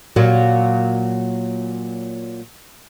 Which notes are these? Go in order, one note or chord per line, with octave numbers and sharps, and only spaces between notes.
A#2 F#3